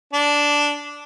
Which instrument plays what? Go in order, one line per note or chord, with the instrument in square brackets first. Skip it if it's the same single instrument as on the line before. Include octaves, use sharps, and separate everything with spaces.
[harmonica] D4